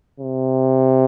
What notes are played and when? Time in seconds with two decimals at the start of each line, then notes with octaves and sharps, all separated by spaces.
0.20 C3